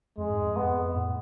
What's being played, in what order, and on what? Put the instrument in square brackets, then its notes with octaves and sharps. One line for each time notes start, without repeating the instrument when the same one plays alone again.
[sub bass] F2 [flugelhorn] G#3
[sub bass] G#2
F2
[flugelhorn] B3
[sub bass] A2